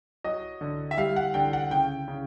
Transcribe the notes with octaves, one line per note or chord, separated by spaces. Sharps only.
F#3 D#5
D3
E5
G3 F5
F#5
D3 G5
F#5
C#3 G5
C#3